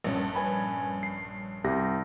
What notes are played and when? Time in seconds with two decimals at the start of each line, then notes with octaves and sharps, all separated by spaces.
0.04 A#1 G2 C#4
0.35 B4 G#5 B5
1.03 C7
1.64 C2 G4 A#6